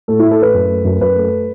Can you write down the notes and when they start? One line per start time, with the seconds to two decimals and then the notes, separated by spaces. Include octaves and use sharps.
0.08 A2 A4
0.19 A2 E4
0.31 A4
0.39 A3 B4
0.54 F#2
0.70 A3
0.85 F#2
1.00 F#2 B4
1.16 A3